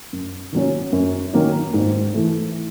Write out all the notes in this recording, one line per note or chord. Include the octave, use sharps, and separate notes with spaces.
F#2
D#3 F#3 A#3 C#4
F#2
D#3 F#3 A#3 C#4
G#2
E3 A3